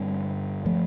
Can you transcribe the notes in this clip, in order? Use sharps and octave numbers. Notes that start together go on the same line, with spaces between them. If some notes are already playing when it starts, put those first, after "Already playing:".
Already playing: G2 D3 G3 C4
F3 A3